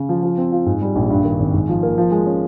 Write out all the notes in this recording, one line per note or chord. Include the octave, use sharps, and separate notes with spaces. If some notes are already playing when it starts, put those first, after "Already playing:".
Already playing: C#3
F3
F3
C4
F4
G#2
G3
A#1
G2
D#3
G#1
G#2
F3
A#3
F3
G#3
C#4